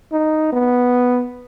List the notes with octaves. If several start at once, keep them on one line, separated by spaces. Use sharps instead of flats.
D#4
B3